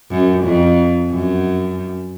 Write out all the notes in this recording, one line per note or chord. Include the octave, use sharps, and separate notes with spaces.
F#2
F2
F#2